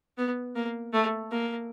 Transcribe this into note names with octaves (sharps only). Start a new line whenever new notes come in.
B3
A#3
A3
A#3